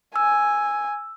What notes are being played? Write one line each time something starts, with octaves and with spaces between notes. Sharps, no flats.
G#5 E6